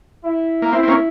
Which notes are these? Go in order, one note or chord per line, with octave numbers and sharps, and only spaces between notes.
E4
A#3
C4 E4
C4
A#3 C#4